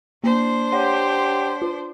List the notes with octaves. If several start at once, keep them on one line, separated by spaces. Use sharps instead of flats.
A#3 D4 C5
G4 C#5 F#5 C6
F4